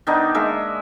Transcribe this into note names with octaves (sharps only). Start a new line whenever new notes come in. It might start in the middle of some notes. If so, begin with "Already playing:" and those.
D#3 B3 D4 D#4
G#3 A#3 E5